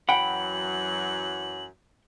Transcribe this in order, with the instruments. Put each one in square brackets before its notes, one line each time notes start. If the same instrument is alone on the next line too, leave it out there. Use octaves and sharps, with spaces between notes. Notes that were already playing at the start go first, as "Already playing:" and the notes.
[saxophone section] F#2 E3 F#3 [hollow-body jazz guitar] F#5 G5 [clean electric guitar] B5 [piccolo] F#7